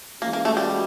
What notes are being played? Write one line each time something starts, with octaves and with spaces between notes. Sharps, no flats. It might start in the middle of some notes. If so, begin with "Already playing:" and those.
E3 G#3 A#3 C#4 F#4
A#3
A3
G3